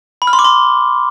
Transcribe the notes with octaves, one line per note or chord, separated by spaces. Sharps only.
B5
F6
C6
D6
C6